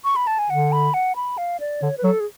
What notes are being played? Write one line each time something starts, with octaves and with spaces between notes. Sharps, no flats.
C#6
B5
A5
G#5
D3 F#5
B5
F#5
B5
F5
D5
D3 C#5
B4
F#3 A4
G#4